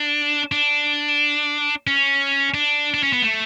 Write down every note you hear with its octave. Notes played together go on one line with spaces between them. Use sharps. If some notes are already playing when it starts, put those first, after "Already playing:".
Already playing: D4
D4
C#4
D4
D4
C#4
B3
A3